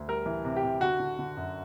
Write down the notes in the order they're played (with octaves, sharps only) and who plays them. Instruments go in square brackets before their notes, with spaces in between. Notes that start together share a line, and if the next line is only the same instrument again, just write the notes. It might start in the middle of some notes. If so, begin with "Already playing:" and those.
Already playing: [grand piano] D2
G3 A#4
E3
C3
G4
C3
D3 F#4
D3
D3
F#2